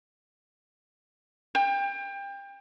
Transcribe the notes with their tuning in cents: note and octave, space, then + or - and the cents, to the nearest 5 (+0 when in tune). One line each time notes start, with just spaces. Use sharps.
G5 +25